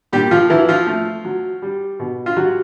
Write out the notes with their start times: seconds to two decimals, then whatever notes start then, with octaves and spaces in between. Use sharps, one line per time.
0.13 A#2 G3 G4
0.31 F3 F4
0.50 E3 F#3 E4
0.69 F3 F4
0.87 A3
1.25 F#3
1.62 G3
1.99 B2
2.26 F4
2.36 F#3 G3 F#4